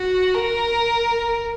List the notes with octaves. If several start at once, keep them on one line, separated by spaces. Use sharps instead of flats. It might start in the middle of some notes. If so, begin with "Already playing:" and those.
Already playing: F#4
A#4